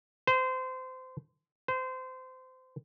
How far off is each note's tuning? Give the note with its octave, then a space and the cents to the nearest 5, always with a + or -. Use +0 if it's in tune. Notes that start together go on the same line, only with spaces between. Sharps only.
C5 -25
C5 -25